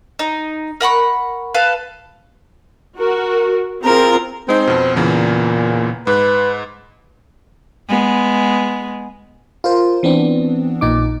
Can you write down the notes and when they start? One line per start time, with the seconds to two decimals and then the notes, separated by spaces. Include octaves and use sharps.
0.19 D#4
0.81 A#4 F#5 B5 C#6
1.54 A4 B4 F5
2.98 F#4 A#4
3.84 C4 F4 G#4 A#4
4.49 G#3 C4 D#4
4.67 F2 B2
4.96 E2 A#2 C#3 E3
6.07 G#2 B4
7.89 G#3 B3
9.64 F4 A#4 C5
10.03 E3 B3 C4 D4
10.81 A#1 A#2 D#4 D6